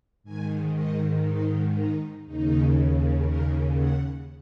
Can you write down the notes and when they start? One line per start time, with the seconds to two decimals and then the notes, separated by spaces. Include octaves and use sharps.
0.23 G#2 D#3 G#5
0.75 D#5
1.25 D#4
1.75 D#4
2.25 D#2 C#3 D#4
3.26 A#4
3.77 F#5